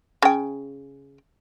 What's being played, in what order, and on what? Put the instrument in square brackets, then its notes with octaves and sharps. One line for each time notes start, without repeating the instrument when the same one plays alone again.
[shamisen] C#3 G5